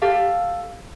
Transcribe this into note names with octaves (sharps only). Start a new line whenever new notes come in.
G4 A4 F5